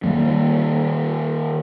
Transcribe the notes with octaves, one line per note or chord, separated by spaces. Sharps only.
D#3 G3 A#3